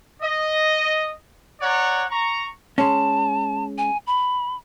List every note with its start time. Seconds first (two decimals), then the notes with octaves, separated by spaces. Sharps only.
0.22 D#5
1.61 C#5 D5 F#5 A#5
2.11 A#5 C#6
2.78 G#3 C#4 A5
3.78 G#5
4.07 B5